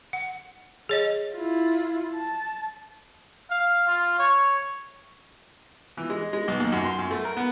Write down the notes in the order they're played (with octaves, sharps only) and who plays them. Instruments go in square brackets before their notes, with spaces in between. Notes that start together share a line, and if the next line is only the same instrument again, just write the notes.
[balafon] F#5
G#4 C#5 D#5
[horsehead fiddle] E4 F4
A5
[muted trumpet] F5
F4
C#5
[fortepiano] E3
G#3
G#3
B1
D#2
F#2
C6
F#2
A3
A#4
B3